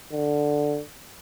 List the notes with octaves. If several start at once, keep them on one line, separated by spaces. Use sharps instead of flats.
D3